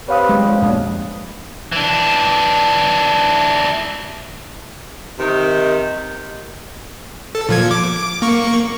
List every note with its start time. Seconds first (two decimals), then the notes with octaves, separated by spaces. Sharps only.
0.09 C4 G4 B4 C#5 F5 D#6
0.29 G#3
0.42 D3 F3
0.62 A#1 F2 B2 D4
1.72 E3 D4
5.19 C3 D#3
7.35 A4
7.49 A#2 F3 G#6
7.71 D6
8.22 A#3 C#6